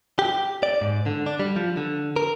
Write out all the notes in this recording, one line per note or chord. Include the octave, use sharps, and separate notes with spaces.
G4
D5
G#2
D3
D4
G3
F3
D3
A#4